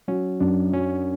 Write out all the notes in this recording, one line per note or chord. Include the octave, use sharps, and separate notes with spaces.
F#3 C#4
F#2 D4
F#3 C#4